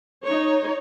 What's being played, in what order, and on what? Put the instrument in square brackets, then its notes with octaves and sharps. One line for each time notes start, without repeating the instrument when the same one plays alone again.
[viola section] D#4 C#5